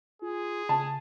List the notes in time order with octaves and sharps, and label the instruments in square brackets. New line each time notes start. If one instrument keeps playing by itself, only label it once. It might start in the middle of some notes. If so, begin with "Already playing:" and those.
[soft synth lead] F4 [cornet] G#4
[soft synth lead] C#3 [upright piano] A5